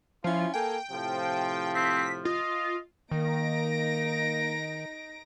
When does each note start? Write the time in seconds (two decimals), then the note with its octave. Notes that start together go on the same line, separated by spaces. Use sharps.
0.24 F3 C#4 E4 F4
0.54 A#3 A4 G5 G#5
0.91 A2 C3 F3
1.75 C4 B6
2.25 F4 D#5
3.11 D#3 A#3 D#4 A#6 D7